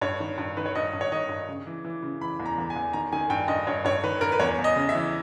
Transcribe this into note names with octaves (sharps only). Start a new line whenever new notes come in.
G2 C#5
D#3
G2
D#3 B4
C#5
G2 D#5
G2
C#5
D#3 D#5
G2
C#3
E3
E3
C#3
E3 B5
E2
A#5
E2
G#5
E2
D#3 A#5
D#3 G#5
G2 G5
G2 D#5
G2 C#5
G2 C#5
D#3 B4
G2 A#4
B4
E2 C#5
E2
D#5
C#3
E5
E3